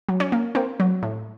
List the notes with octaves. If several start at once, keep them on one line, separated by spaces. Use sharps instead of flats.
F#3
C#4
A#3
A#3 C4
F#3
A2